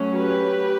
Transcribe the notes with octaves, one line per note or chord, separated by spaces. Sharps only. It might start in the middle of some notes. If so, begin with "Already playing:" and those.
Already playing: F#3 A3 C#4
G4 B4